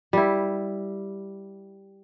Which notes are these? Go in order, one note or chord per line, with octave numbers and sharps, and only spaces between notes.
G3 E4